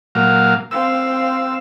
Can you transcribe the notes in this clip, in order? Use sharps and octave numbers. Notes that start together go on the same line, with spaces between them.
A#2 F#3 F5
C4 F5 E6